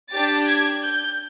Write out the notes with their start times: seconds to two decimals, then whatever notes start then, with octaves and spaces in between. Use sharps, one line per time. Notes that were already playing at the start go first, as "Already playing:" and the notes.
0.11 D4 G4 A6
0.46 G#6
0.83 G6